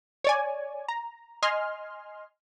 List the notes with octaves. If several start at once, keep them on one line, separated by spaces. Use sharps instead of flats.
C#5 D5 G#5
A#5
D#5 G#5 C6 F6